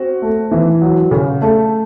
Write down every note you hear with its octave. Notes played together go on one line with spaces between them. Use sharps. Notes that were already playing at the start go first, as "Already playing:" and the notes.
Already playing: C4 F#4
A3
E3
F#3
C#3
A3